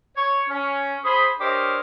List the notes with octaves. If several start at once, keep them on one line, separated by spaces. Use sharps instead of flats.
C#5
C#4
G#4 C5 B5
D4 G4 A#4 C5 C#5 D#5